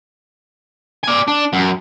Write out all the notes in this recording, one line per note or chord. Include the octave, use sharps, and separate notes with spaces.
D5 G#5
D4
F#2